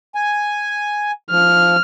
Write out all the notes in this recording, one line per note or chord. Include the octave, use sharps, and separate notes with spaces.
G#5
F3 F6